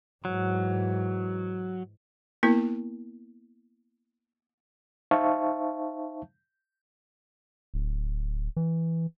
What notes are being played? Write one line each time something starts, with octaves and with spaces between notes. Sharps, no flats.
G#2 E3 F#3
A#3 B3 E4 A#4
D#4 C5 E5 F5 A5 C#6
D1
E3